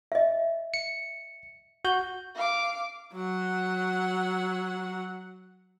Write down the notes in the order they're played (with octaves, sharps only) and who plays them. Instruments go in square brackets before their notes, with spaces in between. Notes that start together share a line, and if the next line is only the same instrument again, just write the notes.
[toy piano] D#5 E5
[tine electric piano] C#7
F#4 G6
[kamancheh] F5 D6
[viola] F#3 F#5